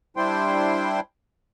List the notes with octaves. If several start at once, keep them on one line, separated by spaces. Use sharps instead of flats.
G3 D4 E4 C5 G5 C6